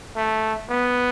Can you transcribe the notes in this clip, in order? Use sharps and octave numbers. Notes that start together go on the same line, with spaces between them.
A3
B3